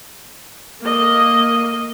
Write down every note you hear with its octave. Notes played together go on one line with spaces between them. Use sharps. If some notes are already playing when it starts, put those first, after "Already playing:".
A#3 D#5